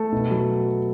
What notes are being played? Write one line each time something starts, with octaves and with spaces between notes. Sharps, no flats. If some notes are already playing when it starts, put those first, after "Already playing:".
Already playing: A3 A4
B2
F#3